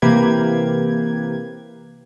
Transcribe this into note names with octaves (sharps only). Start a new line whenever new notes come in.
C3 E3 A#3 G4 B4 G#6